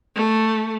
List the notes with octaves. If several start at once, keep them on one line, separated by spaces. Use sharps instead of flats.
A3